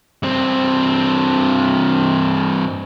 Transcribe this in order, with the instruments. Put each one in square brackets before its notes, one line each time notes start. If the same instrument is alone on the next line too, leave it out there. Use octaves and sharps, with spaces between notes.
[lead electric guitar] G2 C4